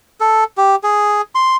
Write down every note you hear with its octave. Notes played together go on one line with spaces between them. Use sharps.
A4
G4
G#4
C6